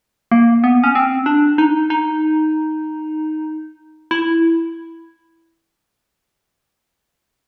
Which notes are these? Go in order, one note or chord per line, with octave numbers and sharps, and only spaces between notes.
A#3
B3
C#4
C4
D4
D#4
D#4
E4